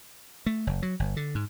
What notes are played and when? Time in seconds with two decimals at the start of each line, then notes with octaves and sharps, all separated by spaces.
0.46 A3
0.67 F#1
0.82 F#3
1.00 G1
1.17 D3
1.35 G#2